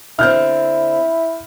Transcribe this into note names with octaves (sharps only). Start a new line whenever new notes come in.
D3 C4 E4 F6 G6